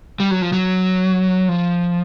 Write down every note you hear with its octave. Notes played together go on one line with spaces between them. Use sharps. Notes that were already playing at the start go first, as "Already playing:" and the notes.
G3
F#3
F3
F#3
F3